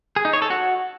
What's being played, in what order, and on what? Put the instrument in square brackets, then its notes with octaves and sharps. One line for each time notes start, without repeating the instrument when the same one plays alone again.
[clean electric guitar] G#4
D#4
C#5
A4
F#4